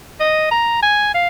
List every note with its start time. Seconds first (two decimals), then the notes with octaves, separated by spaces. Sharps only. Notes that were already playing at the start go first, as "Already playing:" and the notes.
0.20 D#5
0.51 A#5
0.83 G#5
1.14 F5